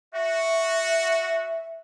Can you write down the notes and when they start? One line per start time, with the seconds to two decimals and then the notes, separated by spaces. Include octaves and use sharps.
0.13 F#4 E5